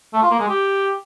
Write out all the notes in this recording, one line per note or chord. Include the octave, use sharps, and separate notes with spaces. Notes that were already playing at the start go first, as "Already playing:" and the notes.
A3
F4
A#3
G#3
G4